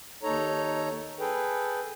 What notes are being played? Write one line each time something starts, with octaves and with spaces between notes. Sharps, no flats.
D#2 D#4 A4 C#5 A#5
G#4 A4 B4 G5